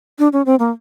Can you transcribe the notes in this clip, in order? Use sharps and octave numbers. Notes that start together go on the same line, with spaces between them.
D4
C#4
C4
A#3